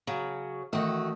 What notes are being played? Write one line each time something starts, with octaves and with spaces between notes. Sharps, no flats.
C#3 F#3
A1 D#3 A3 F#4